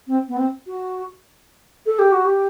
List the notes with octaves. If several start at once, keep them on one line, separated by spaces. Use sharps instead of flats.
C4
B3
C4
F#4
A4
G4
F#4
G4